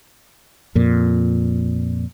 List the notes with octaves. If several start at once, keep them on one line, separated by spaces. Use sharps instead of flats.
F2 A#2